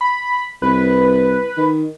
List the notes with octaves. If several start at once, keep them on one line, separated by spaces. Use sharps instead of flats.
B5
C2 B4
D#3